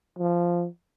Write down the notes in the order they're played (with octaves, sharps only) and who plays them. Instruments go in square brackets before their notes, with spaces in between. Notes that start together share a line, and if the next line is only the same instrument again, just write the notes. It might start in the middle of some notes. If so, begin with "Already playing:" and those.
[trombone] F3